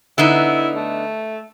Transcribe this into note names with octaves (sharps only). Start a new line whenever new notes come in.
D3 B3 D#4 E4
A3